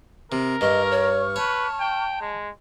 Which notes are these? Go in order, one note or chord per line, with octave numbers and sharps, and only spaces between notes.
C3 A#4
G2 D#5 C#6 F6
C#5
B4 C#5 A5
G5
G#3